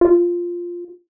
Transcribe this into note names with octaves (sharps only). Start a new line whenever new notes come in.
F4